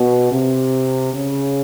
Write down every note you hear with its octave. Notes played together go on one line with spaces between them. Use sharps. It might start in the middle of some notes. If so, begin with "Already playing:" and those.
Already playing: B2
C3
C#3